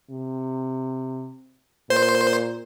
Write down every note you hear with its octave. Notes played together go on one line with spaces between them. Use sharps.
C3
A#2 C5